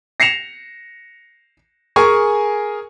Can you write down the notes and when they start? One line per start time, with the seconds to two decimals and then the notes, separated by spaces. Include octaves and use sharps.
0.20 A#6 C7 C#7 E7 F7
1.96 G#4 A#4 G#5 C#6